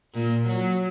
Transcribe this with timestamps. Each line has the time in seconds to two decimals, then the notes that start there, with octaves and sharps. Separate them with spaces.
0.14 A#2
0.48 F#3